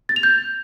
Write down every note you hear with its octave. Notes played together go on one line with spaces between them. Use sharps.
A6
F7
G6